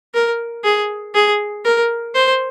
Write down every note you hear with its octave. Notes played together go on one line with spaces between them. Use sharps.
A#4
G#4
G#4
A#4
C5